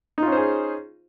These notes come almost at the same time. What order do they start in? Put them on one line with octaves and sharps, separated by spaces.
D#4 F4 C#4 C5 G#4